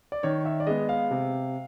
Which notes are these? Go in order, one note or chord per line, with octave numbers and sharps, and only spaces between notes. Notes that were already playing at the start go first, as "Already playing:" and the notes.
D5
D#3 C#5
E5
D5
G#3 B3 D#5
F5
C3